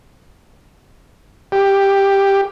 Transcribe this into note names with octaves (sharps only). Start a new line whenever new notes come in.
G4